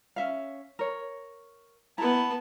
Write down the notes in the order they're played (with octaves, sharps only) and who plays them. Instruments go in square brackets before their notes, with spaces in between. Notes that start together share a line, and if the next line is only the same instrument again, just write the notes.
[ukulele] C#4 E5 F5
A#4 C#5
[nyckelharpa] B3 A5 [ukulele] E4 A#5